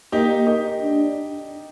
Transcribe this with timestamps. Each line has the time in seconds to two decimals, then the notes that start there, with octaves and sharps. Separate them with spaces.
0.12 A#3 D#4 G4
0.47 D#4 G4
0.81 D4